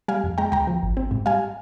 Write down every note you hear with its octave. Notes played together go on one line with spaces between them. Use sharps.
G3 F5 G#5
F2
G#3 G5 A#5
D2 G5 A#5
F3
G#1
C4
G#2
G3 F5 G#5